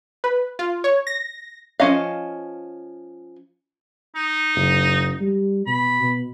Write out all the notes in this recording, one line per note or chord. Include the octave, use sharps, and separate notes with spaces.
B4
F4
C#5
A#6
F3 C#4 D#5 F5
D#4
F#1
G3
B2 B5
B2